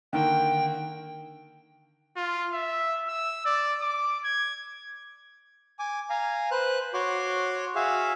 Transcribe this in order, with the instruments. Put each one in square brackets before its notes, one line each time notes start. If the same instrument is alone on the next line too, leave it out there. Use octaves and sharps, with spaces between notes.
[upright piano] D3 D#3 A#3 [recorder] G5
[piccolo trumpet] F4
E5
E6
D5
D6
G#6
[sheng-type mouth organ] G#5 D6
F5 G#5 A#5
B4 C5 F#6
F#4 C#5 C6 D6
F#4 G#4 E5 F5